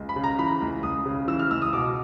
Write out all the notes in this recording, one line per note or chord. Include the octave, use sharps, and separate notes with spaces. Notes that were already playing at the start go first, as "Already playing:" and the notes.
Already playing: C#2
B5
C#3
A#5
E3 B5
C#2
C#2 D#6
C#3
E3 E6
F6
C#2 E6
D#6
B2 D6